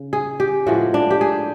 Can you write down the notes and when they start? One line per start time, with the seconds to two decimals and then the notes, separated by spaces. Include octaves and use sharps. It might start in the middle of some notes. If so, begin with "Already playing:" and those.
Already playing: C#3
0.13 G#4
0.40 G4
0.66 A2 F3 G#3 F#4
0.94 D4
1.10 G4
1.21 G#4